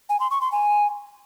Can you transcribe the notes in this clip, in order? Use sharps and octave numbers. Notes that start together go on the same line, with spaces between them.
G#5
C6
C#6
C6
G#5